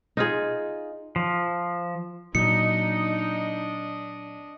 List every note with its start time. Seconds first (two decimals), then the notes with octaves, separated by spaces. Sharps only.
0.17 D#4 F4 G#4
1.16 F3
2.35 A#2 F#3 D4 D#4 D#5 C#7